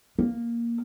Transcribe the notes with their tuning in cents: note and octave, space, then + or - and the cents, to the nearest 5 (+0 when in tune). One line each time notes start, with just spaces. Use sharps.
A#3 +5